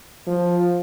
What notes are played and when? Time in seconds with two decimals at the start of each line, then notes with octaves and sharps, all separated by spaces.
0.27 F3